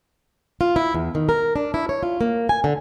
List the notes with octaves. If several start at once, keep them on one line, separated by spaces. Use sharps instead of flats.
F4
E4
E2
D#3
A#4
D4
E4
C#5
F4
A#3
G#5
D3